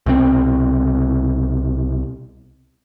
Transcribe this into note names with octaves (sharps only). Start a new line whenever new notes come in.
C2 B2 C4